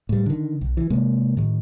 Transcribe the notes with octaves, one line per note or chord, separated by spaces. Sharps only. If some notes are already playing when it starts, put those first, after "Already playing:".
A2 G3
D3 D#3
B1
E3
C3 G#3 A#3
A2 D#3